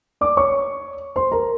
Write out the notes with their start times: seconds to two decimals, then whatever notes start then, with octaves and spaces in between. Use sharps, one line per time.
0.21 D5 D6
0.37 C#5 C#6
1.16 C5 C6
1.32 A#4 A#5